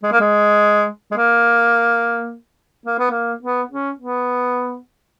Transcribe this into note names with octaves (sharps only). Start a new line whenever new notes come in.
G#3
A#3
G#3
G#3
A#3
A#3
B3
A#3
B3
C#4
B3